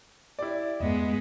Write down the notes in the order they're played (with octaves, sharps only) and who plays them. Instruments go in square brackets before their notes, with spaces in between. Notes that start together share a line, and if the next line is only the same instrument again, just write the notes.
[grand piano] E4 G4 D5
[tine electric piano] E2 G2 [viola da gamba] G#3 B3 [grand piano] D#5